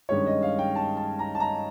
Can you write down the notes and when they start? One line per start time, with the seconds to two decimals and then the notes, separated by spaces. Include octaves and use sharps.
0.09 G2 D#3 G#3 C#4 C#5
0.26 D#5
0.42 F5
0.59 G5
0.76 A5
0.97 A5
1.19 A#5
1.35 A5
1.40 A#5